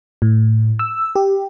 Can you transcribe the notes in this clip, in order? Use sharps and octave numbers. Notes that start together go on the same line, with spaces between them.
A2
E6
G4